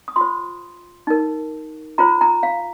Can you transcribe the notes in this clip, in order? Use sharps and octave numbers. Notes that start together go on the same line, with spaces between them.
D#6
F4 C5 C6
D#4 A#4
F4 C5 A#5
A#5
F5